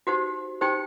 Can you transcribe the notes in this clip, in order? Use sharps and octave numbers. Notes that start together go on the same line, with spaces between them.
D#4 F#4 G4 C5 F#5
D#4 G4 C5 G5